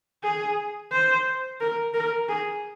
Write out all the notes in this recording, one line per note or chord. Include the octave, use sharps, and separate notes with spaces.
G#4
C5
A#4
A#4
G#4